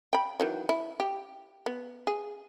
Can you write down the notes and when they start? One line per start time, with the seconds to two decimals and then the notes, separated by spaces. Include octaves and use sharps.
0.13 G5 B5
0.40 D#3 E3 F#3
0.69 E4
1.00 G4
1.66 B3
2.07 G#4